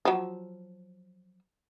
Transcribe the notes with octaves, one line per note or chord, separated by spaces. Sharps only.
F3 F#3